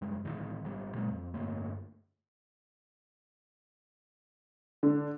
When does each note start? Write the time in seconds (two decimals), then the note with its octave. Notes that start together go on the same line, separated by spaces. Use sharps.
0.02 F#1 F#2 G3 G#3
0.25 A2 D#3 E3
0.64 G#1 G3
0.95 A#2 F#3 G#3 A#3
1.11 F2
1.34 D2 G2 A3 A#3
4.83 D3